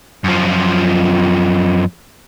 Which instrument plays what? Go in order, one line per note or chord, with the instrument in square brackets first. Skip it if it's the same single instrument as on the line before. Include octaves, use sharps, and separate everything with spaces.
[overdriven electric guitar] F#2 F3